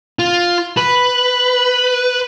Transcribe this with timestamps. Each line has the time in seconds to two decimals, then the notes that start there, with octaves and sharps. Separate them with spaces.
0.19 F4
0.77 B4